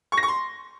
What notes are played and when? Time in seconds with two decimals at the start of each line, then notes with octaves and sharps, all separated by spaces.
0.12 C#6
0.18 A#6
0.23 C#6
0.28 C6